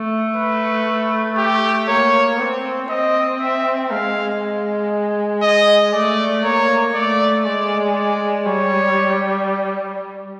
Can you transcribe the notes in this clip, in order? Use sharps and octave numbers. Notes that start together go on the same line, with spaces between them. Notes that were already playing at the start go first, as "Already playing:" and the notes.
Already playing: A3
B4
G4
A#3 C#5
C4
C4 D#5
E5
G#3 F5
D#5
A3 D5
A#3 C#5
A3 D5
G#3 D5
D5
G3 C#5